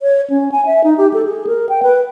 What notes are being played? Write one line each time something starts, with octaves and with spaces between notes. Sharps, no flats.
C#5
C#4
G#5
E5
D#4
G4
A4
G#4
A#4
G5
B4